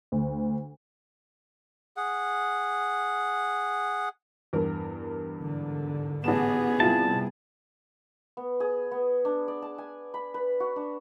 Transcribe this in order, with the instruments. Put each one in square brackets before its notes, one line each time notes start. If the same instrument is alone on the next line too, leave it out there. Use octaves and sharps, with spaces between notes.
[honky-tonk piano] D2
[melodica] G#4 F#5
[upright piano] E2 G2 A#4
[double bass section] G#2 D3
[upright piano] A1 A5 E7 [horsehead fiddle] B3 G#4
[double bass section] C3 G3 [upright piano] E4 F4 [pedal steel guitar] A5
[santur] B3
G#4
B3
D4
D5
A5
G#5
B5
B4
F#4
D4